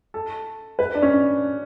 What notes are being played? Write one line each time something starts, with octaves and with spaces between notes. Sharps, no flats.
A4
B4
D4
C#4
D4